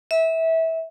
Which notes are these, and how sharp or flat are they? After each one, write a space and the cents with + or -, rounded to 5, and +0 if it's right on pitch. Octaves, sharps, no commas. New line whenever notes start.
E5 -20